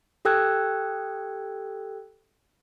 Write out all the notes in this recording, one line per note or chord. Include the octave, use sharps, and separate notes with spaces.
G4 A4 G5 E6 F#6 G#6